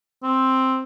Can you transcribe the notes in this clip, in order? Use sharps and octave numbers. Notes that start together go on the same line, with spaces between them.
C4